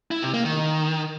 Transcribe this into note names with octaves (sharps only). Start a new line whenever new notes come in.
E4
C3
A#3
D#3